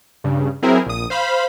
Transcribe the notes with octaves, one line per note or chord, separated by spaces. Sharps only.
G2 C#3
F#3 C4 E4 G#4 A#4
A#1 D#6
C5 F5 B5